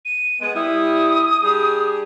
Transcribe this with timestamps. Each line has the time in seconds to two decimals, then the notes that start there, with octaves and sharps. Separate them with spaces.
0.05 D#7
0.41 G#3 B3
0.55 G3 E4 D#6
1.42 G3 D4 G#4